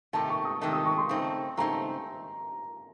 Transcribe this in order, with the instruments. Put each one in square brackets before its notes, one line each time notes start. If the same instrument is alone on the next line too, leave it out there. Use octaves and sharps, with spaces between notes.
[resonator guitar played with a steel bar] C3 D#3 A3 D#4 [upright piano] A5
[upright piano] C#6
D#6
[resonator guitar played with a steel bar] C3 D#3 A3 D#4
[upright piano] D#6
C#6
C6
[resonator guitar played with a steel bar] C#3 A3 C4 D#4
[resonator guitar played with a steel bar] C#3 A3 C4 D#4 [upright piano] A#5